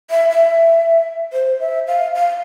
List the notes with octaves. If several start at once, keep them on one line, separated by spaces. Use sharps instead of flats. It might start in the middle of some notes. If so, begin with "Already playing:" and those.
E5
E5
C5
E5
F5
F5